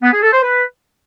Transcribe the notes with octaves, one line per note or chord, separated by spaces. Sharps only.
B3
G#4
A4
C5
B4